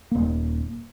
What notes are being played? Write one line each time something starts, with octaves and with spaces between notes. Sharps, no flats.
D#1 A#3